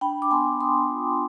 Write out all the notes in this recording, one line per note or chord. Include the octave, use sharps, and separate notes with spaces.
D4 G5 B5
D6
B3 G#5 C6
B3 C6 D#6
F4